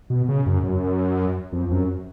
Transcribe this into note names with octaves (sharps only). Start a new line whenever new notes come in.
B2
C#3
F#2
F#2
F2
F#2